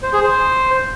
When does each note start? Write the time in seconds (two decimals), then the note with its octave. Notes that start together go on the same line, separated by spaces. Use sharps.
0.03 C5
0.13 G#4
0.23 C5